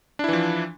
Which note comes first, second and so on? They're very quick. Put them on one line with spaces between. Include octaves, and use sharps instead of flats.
D4 E4 E3 F3